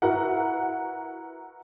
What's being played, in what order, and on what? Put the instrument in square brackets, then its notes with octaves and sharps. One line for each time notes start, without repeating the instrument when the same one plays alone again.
[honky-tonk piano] E4 F#4 A#4 B4 F#5